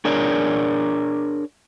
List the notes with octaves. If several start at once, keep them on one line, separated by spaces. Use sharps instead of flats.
D4 G#4 A#4 C#5 D5